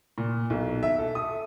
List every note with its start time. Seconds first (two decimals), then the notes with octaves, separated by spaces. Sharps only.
0.18 A#2
0.50 B1
0.83 E5
0.99 A4
1.15 D#6